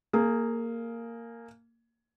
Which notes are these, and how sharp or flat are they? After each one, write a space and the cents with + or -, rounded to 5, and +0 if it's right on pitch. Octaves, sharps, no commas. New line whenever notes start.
A#3 -10 G#4 +15